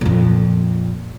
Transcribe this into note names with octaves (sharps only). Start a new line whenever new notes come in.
F2 A#2